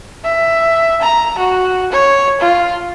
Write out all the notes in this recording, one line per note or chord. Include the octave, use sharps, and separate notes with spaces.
E5
A#5
F#4
C#5
F4